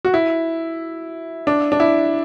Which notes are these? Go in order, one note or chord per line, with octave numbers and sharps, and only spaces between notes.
F#4
E4
D4
D4
E4